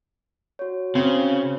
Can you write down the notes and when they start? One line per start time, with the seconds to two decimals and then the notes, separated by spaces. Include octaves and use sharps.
0.59 F#4 C#5
0.95 C#3 C4